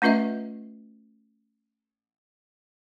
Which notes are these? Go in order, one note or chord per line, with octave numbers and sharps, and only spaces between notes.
A3 C#4 F4 B4 D#5 E5